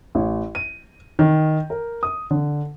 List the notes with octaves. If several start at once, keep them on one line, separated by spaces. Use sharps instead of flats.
A1
D#7
D#3
A#4
D#6
D3